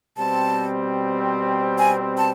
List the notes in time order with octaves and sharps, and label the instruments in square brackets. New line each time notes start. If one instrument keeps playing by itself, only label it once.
[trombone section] B2 G3 C4 [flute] A5
[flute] G#5
A5